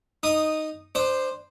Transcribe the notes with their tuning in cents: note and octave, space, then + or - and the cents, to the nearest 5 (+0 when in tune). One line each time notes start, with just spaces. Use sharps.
D#4 +0 D#6 -15
D4 +25 C5 +0